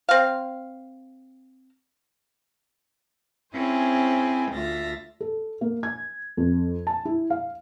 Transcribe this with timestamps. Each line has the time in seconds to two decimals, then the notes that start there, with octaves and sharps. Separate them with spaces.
0.09 C4 F5
3.53 C4 C#4 E4 G#4 C5 G#5
4.51 D2 F4 E5 A6 A#6
5.21 A4
5.61 A#3
5.83 G#6
6.37 F2
6.87 A5
7.05 E4
7.30 F5